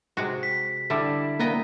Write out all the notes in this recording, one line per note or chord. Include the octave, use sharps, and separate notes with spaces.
C3 G#3 F#4
B6
D3 G3 D4 E4 E5
A#3 B3 D#5 G5